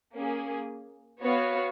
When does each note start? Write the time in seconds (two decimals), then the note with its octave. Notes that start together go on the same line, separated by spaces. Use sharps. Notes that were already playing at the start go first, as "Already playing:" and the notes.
0.15 A#3 C#4 G#4
1.21 B3 F#4 C#5 F5